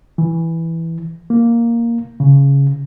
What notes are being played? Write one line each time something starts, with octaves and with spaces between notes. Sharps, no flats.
E3
A#3
C#3